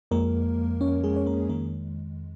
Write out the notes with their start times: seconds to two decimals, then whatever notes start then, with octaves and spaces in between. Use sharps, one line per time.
0.11 F2 F3 G#3 A#3 A#4
0.81 C#4 C#5
1.04 G#3 G#4
1.16 C#5
1.26 A#3 A#4
1.49 F2 D#3 G#3 A#3 A#4